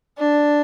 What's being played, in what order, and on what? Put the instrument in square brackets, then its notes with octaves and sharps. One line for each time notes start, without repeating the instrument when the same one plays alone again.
[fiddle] D4